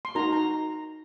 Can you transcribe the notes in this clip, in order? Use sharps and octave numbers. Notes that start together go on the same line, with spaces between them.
C6
D#4 F#4 A#4 A#5
A#5